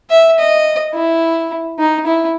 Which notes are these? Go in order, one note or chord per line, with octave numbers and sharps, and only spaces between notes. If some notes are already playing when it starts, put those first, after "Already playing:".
E5
D#5
E4
D#4
E4